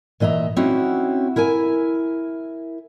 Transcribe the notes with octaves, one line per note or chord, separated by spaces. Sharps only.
A#2 E3 D#5 E5 A#5
C4 C#4 D#4 E4 F#4
E4 A#4 E5 G#5